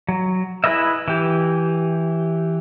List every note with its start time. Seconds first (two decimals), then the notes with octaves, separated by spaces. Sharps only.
0.09 F#3
0.64 E4 G#4 B4 D#5 E5
1.08 E3 G4